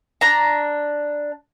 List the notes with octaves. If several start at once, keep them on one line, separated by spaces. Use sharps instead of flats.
D4 A#5